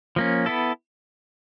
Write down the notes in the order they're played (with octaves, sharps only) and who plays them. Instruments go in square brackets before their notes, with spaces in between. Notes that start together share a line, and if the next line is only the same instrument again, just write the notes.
[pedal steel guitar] F3 A#3 C#4
B3 E4 A4